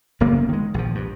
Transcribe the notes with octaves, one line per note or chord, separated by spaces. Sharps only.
F#1 C#3 A#3 B3
D#3 G#3
A#1 F3
G2